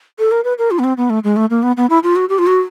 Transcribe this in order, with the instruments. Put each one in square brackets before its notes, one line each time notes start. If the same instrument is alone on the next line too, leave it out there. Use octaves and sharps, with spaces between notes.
[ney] A4
A#4
B4
A#4
F4
B3
C4
B3
A3
G#3
A3
A#3
B3
B3
E4
F4
F#4
G4
F4
F#4